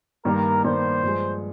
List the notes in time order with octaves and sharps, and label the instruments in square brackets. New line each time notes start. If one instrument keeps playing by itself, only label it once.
[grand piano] G2 D#3 G3 A#3 [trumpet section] A#4
[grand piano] G2 D#3 G3 A#3 [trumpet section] C5
[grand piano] G2 F3 G#3